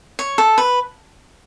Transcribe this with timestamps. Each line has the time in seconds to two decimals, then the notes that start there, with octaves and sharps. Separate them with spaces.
0.19 C#5
0.38 A4
0.58 B4